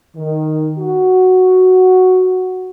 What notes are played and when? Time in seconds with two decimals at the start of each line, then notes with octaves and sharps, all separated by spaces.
0.16 D#3
0.78 F#4